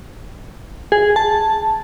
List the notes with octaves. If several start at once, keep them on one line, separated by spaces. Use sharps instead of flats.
G#4
A5